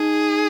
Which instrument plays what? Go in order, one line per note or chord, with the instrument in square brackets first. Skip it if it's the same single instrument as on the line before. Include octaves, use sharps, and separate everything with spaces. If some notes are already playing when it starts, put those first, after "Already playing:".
Already playing: [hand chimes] D#4 [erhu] G#4